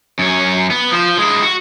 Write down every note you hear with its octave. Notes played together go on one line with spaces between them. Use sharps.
F#2 C#4
B3
F3 C5
G#3 E4
F#4